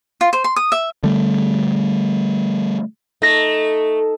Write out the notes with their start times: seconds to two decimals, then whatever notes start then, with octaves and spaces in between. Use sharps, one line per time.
0.21 F4
0.33 C5
0.44 C6
0.56 D#6
0.72 E5
1.03 D3 G3 A3
3.22 A3 D#4 A#6